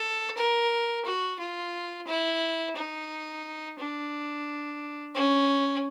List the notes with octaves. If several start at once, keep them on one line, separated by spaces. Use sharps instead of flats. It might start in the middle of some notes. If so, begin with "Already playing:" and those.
Already playing: A4
A#4
F#4
F4
E4
D#4
D4
C#4